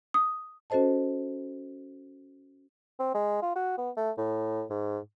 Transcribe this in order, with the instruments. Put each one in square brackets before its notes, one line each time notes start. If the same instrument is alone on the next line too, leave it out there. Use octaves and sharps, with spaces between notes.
[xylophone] D#6
[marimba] C#4 F#4 A4 C5 D#5 A5
[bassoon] C4
G#3
F4
F#4
B3
A3
A2
G#2